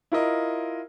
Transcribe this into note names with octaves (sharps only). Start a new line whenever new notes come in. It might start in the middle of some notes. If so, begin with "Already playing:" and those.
E4 F4 A#4 D#5